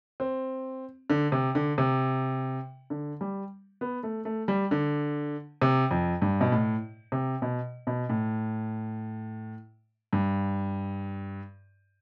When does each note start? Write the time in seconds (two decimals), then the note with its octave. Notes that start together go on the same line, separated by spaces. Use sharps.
0.20 C4
1.10 D3
1.32 C3
1.55 D3
1.78 C3
2.90 D3
3.21 G3
3.81 B3
4.03 A3
4.25 A3
4.48 G3
4.71 D3
5.62 C3
5.91 F2
6.22 G2
6.41 B2
6.52 A2
7.12 C3
7.42 B2
7.87 B2
8.09 A2
10.13 G2